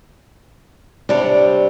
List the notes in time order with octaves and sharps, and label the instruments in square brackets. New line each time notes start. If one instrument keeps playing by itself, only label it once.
[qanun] C3 G3 C#5 [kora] D4